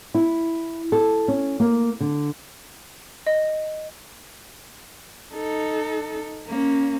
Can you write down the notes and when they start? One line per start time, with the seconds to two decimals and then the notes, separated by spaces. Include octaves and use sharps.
0.14 E4
0.92 A4
1.28 C#4
1.60 A#3
2.00 D3
3.26 D#5
5.34 D#4 A4
6.47 A#3 C#4